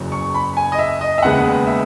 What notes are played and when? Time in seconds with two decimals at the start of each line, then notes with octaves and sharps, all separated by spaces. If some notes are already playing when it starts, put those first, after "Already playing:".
Already playing: F#1 E2 C#3 F#3
0.12 C#6
0.34 B5
0.57 G#5
0.72 D#5
0.79 E5
1.01 D#5
1.18 E5
1.22 E1 D#2 C#3 G#3 B3 F#5
1.67 E5